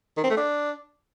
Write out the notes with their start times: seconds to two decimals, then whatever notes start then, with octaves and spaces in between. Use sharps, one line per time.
0.17 D#3
0.24 C4
0.30 A3
0.37 D4